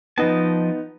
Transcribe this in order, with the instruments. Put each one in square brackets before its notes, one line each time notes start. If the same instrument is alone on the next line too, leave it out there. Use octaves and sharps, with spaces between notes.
[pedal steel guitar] F3 D#5 A5 [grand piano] B3 D#4